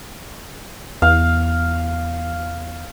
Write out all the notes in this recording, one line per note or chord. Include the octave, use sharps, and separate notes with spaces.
E2 F5